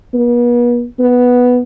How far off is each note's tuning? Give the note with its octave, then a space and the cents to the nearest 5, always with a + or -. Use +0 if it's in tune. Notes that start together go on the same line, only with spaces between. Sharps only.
B3 -40
B3 +0